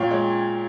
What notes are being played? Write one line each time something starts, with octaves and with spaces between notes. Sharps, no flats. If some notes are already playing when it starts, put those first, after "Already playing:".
Already playing: A#2 C#5 F5 G5
G#3 C#5